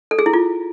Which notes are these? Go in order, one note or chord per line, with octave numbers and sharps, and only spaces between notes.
A4
G#4
E4
F4